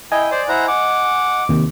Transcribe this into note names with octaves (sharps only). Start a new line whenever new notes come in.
E4 D#5 G5 G#5
C5 D5
E4 C5 F#5 A#5
F#5 D6
D#2 C3 D#3